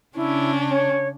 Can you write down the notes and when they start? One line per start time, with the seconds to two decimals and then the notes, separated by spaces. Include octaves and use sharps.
0.15 C#3 C#4 D4 E4
0.70 C#5